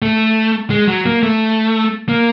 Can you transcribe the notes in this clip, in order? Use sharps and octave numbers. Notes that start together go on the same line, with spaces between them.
A3
G#3
F#3
A#3
A3
A#3